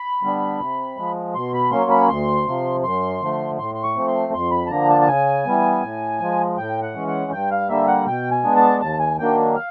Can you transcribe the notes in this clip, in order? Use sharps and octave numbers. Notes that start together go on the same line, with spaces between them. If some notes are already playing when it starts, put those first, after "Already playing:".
Already playing: B5
D3 G3 B3 D4
C3
F3 G#3
B2 C6
B5
F#3 A#3 C#4 C6
B5
D2 C6
C3 F3
F#2 C6
D3 F3 A3
A2 C6
C6
C#6
F3 A3 C4
C6
F2 C6
B5
A5
D3 F3 A#3 D4 A#5
A5
A5
C#3 G#5
E3 G3 B3
A2
F3 G#3
A2 G5
F#5
E3 G#3 C#4
F#5
G2 G5
F5
D3 G3 A#3 E5
F#5
B2 G5
G#5
G#3 B3 D4
A5
D#2 A5
G#5
D#3 F#3 A#3 D4 G5
F5